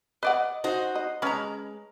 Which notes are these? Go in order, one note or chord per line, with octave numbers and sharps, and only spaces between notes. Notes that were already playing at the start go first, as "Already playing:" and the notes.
B4 D5 D#5 F#5
D#4 F#4 C5
D#5
G#3 C#4 B4 A#5